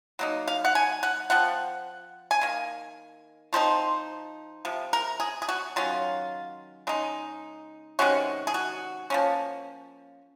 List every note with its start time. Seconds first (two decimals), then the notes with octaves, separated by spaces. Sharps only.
0.19 F#3 A#3 D#4
0.48 F5
0.65 F#5
0.75 G#5
1.03 F#5
1.30 F3 C4 F#5
2.31 G#5
2.41 D#3 A#3
3.53 F3 C4 D#4 C5
4.65 C3 F3
4.93 A#4
5.20 G#4
5.42 G#4
5.49 F#4
5.76 D#3 F#3 C#4 F4
6.87 C#3 G#3 D#4
7.99 C3 D#3 G#3 C#4 F#4
8.47 G#4
8.54 F#4
9.10 F3 A#3 C#4